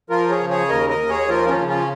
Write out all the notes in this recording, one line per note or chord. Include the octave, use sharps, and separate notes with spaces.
F3 F4 A#4
G#4 C#5
C#3
G#4 C#5
D#2 A#4 D#5
A#4 D#5
D#2
G#4 C#5
F3 F4 A#4
C#4 F4
C#3
C#4 F4